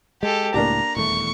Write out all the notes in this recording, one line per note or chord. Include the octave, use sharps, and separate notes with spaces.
G#3 G4 A4
C#2 A2 A#3 D4 G4 A#5
D#1 E2 A3 C#6